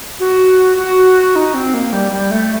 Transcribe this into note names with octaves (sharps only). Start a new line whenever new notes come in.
F#4
F#4
D#4
C4
A#3
G3
G3
A3